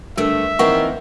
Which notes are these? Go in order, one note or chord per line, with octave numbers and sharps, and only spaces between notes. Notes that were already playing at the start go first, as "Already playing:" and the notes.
G2 D3 A3 A#4 E5
D#3 E3 A#3 C4 F#5 C#6